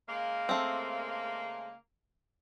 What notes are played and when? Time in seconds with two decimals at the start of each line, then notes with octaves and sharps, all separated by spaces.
0.08 C#3 G#3 A#3
0.49 A3 C4